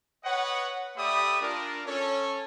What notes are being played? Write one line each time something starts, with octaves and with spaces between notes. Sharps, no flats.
B4 C#5 D#5 F#5
A3 G4 D5 E5 B5 D#6
D4 F4 A#4
C#4 A4 C#5